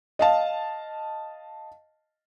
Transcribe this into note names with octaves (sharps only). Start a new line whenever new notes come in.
D#5 F5 A5